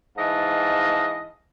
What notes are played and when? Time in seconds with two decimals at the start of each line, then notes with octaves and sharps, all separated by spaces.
0.18 G#2 E3 D#5 F5 A5